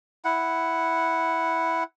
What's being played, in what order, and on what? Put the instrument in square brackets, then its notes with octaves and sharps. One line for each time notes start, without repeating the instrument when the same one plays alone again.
[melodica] E4 F#5